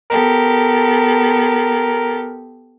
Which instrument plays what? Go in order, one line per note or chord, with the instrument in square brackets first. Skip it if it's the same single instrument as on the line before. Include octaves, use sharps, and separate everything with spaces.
[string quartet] B3 G4 A4 [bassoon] A#4